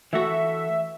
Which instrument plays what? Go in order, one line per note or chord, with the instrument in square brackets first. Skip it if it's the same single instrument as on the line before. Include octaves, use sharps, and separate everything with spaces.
[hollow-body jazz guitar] E3 A3 F#4 [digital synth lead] E5